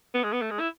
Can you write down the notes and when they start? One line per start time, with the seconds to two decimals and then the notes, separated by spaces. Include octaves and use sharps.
0.14 B3
0.24 G#3
0.33 B3
0.42 A3
0.51 G#3
0.60 E4